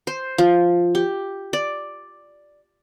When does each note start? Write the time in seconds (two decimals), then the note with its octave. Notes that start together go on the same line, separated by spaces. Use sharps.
0.07 C5
0.38 F3
0.95 G4
1.53 D5